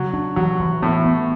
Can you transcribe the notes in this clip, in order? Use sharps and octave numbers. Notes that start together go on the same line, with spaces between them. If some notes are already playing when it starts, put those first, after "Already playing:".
Already playing: C#3 F#3
D4
E3 F#3
E3
A2 B3
B3